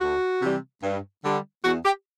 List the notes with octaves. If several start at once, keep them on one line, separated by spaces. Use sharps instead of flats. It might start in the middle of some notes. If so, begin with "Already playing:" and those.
D2 F#4
C3 E3 G3
G2
D3 G3
E2 F#4
G4